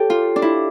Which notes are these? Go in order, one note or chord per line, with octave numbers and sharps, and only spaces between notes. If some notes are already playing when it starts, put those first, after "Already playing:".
Already playing: G4 A4 C#5
F4
D4
E4